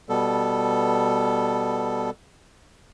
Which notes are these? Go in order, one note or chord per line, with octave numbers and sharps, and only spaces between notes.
B2 G3 B3 A4